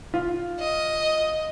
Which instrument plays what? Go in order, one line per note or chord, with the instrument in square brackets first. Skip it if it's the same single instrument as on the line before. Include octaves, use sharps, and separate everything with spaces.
[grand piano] F4
[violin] D#5